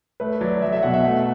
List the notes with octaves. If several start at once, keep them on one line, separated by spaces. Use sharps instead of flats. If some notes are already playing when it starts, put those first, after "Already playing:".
A3 B4
F#3 D5
F#3 E5
E5
B2 F#5
E5
A3 F#5